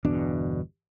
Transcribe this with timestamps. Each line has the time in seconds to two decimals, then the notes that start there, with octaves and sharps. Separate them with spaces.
0.04 G1 E2 B2 D4